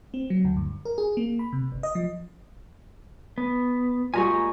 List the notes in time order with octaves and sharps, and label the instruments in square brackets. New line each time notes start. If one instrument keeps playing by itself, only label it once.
[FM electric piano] C4
F#3
D2
G2
A#4
G#4
A#3
B5
C3
G1
D#5
F3
[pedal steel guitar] B3
[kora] A#2 G3 G#3 [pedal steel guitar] G#5 A#5 C#6